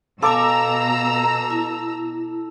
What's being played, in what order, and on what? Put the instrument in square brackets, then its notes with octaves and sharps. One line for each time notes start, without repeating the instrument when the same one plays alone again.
[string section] B2 A#5 E6 [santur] A4 D6 [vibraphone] F5 G#5
[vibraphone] E4